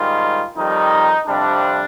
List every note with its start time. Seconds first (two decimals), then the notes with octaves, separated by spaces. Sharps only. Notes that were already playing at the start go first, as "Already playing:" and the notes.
Already playing: G#2 D#3 G3 F4
0.56 F2 D#3 G3 D#4
1.26 F2 C3 G3 D4